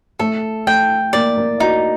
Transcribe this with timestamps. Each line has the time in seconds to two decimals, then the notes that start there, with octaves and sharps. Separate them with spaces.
0.19 A3 A4
0.67 A3 G5
1.13 A#3 D5
1.37 A#3
1.60 D#4 F#4